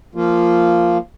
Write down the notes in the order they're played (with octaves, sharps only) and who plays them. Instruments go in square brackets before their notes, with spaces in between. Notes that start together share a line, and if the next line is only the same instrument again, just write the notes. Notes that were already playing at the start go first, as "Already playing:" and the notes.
[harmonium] F3 A#3 F4